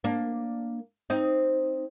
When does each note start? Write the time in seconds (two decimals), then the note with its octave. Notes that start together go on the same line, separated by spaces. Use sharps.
0.04 A#3 D4
1.10 C4 D#4